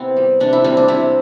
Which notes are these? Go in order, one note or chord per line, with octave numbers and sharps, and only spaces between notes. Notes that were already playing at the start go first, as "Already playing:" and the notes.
Already playing: C3 B3 C4 E4
G3
C3 D4
E4
G3 C4
D4
C3 E4